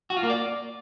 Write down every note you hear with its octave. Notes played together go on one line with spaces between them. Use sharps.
F#4
F4
A#3
D5